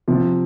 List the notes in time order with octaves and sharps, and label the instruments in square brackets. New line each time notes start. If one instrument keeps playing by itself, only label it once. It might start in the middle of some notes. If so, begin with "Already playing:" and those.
[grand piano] C3 [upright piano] F3